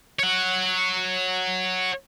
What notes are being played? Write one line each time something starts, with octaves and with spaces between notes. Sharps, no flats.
C#5 F#5